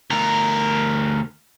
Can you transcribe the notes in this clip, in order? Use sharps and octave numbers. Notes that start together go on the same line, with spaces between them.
D2 A#4